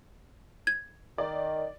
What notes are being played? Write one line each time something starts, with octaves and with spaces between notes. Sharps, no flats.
G#6
D#3 D5